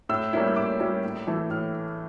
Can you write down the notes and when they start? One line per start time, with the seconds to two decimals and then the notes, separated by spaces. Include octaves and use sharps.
0.09 A2 E6
0.33 G3 A#3 C#4 E4
0.48 E6
0.56 A2 D6
0.80 G3 A#3 C#4 E4
1.04 A2
1.27 E3 A3 E4
1.50 A2 F6